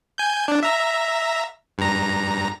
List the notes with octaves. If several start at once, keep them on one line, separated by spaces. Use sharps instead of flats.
G#5 G6
D4
E5 A#5
G2 A#5